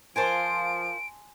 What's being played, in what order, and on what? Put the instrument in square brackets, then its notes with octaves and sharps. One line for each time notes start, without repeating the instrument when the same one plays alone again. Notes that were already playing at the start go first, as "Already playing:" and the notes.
[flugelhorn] F3 [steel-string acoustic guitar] F4 A#4 C5 [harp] G#5 A5 C6 [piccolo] D7